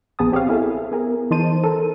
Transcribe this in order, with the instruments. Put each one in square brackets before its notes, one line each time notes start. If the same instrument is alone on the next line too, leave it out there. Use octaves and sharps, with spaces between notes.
[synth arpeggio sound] A#1 B3 G#4 A5 D#6
C4 G4 G#4 C#5 F5
E4 G#4 A4 E5
B3 G#4 A#4
E3 D#4 C5 A5 D#7
A4 A#4